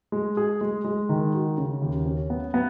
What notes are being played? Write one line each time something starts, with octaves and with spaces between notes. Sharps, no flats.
G#3
G#4
G#3
G#3
D#3
F#4
C#3
D#2
C#4
B3
B3